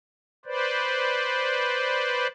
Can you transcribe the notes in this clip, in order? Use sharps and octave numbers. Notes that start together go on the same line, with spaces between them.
B4 C5 D5